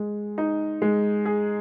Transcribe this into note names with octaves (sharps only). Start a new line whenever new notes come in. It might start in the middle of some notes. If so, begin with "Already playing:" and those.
Already playing: G#3
D#4
G#3
G#4